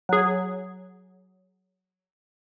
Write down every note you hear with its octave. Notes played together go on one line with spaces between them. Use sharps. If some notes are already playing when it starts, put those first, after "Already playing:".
F#3 G#4